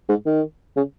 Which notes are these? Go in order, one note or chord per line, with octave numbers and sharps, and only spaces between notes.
G#2
D#3
C#3